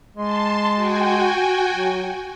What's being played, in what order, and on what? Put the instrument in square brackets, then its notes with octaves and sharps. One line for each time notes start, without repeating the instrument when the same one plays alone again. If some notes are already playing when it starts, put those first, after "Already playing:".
[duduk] G#3 [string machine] A5 C6
[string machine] F#4 G5 G#5
[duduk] F#3